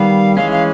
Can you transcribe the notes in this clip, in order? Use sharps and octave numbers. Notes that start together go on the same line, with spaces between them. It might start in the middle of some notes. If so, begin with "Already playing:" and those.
Already playing: D#3 G3 B3 F5
E3 G#3 C#4 F5
F5